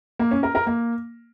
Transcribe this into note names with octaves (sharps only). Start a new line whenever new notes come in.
A#3
C#4
A#4
A#4
A#3